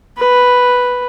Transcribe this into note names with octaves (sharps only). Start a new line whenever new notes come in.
B4